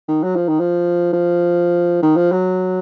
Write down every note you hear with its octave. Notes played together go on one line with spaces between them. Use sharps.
D#3
F#3
F3
D#3
F3
F3
D#3
F3
F#3